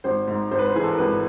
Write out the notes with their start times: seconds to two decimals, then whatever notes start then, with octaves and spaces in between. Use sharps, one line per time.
0.04 G#1 C5
0.28 G#2
0.51 G#1 C5
0.59 B4
0.66 C5
0.75 E3 G#4
0.83 A4
0.91 A#4
0.98 G#1 B4